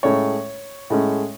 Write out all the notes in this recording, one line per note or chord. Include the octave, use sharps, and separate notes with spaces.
A2 G#3 C#4 C#5
A2 G#3 C#4